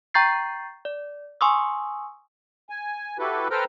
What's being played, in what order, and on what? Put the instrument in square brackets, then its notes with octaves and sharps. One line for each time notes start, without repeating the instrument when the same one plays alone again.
[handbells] G5 A#5 C#6 G6 A6 C7
D5
G#5 C6 C#6 D#6 E6
[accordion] G#5
E4 F#4 G4 A4 B4
A4 B4 C5 G5 A#5 F6